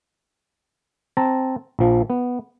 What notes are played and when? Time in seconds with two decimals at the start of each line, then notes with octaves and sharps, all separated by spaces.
1.17 C4 A5 A#5
1.79 A#1 F3
2.10 B3